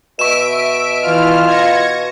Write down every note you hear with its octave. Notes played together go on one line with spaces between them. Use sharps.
B2 E5 C#6 D7 E7
E3 F4 F6
G#6 A#6 C#7